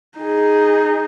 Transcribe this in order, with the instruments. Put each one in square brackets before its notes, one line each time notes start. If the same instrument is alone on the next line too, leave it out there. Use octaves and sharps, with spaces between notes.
[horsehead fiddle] D#4 G#4